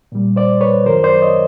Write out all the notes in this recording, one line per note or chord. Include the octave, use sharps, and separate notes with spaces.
A#2 G3
C5 D5
B4 C#5
F#2 D#3 F#3 A#4 C5
C5 D5
C#5 D#5